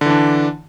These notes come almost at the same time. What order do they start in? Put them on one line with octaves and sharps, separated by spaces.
D3 E3 D4